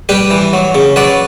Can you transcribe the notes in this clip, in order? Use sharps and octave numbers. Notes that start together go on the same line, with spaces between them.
G3 G4 B4
E3
F#3
C#3
F#3 B4 D5